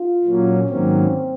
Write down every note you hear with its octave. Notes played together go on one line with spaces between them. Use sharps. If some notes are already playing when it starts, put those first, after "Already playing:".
Already playing: F4
A#2 F#3 A#3 C#4
G#2 D#3 F#3 A#3 C4 C#4